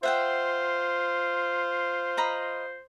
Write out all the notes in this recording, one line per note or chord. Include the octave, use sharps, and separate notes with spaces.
F4 C5 E5 F#5 G5
D#5 A#5 B5